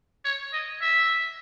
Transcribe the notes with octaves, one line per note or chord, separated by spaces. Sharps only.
C#5
D#5
E5